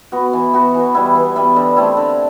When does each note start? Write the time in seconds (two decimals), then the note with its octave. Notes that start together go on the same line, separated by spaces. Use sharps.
0.12 B3 F#4
0.33 E3
0.53 B3 F#4
0.74 E3
0.95 G3 B3 E4
1.15 E3
1.36 G3 B3 E4
1.56 D3
1.76 A3 C4 E4
1.97 D3